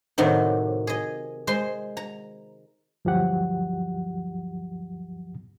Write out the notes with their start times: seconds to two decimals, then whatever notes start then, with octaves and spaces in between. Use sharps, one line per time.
0.18 A2 C3 D#3 F#3 C4 D#4
0.87 G#4 D#5
1.47 G#3 C5 D#5 C6
1.97 A#5
3.05 D2 G2 F3 F#3 G4 F#5